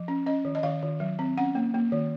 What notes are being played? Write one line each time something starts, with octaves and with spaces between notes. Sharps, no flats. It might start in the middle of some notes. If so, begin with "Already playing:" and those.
Already playing: F3
C#4
C#4 D#5
D#3
D#5
D#3 F5
D#3
F#3
C4
C#4 F#5
A#3
A#3
D#3